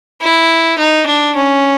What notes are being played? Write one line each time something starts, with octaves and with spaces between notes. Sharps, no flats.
E4
D#4
D4
C#4